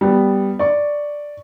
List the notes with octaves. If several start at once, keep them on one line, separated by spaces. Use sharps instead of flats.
G3 B3
D5 C#6